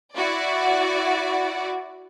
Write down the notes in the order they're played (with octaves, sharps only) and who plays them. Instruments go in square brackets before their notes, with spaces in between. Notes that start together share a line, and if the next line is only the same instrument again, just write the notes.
[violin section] E4 F#4 D5